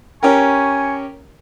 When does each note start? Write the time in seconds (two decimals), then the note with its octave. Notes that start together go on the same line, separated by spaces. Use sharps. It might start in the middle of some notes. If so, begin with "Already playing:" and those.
0.23 C#4 G4 A#4 G#5 C#6